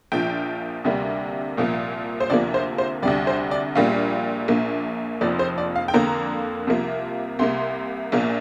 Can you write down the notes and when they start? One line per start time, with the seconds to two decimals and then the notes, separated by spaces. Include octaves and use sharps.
0.12 A#1 A#2 F3 G5
0.84 D2 C3 G3 A#3
1.57 C2 A#2 F3 A#3
2.20 C5
2.30 D2 C3 F3 A#3 D5
2.54 C5
2.78 C5
3.02 D2 C3 G3 D5
3.27 C5
3.51 D5
3.75 A#1 A#2 G3 A#3 F5
4.48 A#1 A#2 A#3
5.21 F1 F2 F3 A#3 D5
5.39 C5
5.58 D5
5.76 F5
5.88 G5
5.94 F2 D3 A#3 A#5
6.67 C2 C3 F3 A#3
7.39 C2 C3 A#3 C6
8.12 A#1 A#2 A#3